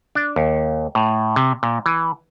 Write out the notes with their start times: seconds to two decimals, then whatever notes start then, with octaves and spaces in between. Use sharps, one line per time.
0.15 D4
0.36 D#2
0.95 A2
1.36 C3
1.63 A#2
1.86 E3